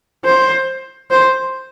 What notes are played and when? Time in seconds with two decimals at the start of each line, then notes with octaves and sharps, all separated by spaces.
0.25 C5
1.11 C5